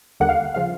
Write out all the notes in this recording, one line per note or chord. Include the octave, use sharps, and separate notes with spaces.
D#2 D3 G3 A#3 F#5
F5
C#3 F3 F5